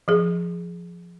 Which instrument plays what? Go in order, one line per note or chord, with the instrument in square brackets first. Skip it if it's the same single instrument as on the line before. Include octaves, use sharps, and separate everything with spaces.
[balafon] F3 G#4